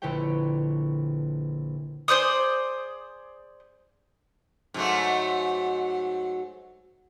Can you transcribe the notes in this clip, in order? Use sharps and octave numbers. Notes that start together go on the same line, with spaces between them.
A#1 D3 E4 B4 C#5 G5
G#4 C5 D5 D#6
G#2 F#3 A3